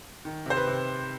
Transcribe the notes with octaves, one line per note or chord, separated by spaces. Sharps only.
D#3
C3 C5
B4
C3